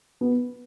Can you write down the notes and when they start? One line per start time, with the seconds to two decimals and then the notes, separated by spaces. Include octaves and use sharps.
0.21 B3